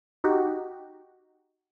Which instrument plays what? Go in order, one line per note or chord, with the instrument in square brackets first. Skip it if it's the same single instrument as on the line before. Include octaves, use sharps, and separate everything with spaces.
[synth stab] D#4 F#4 G4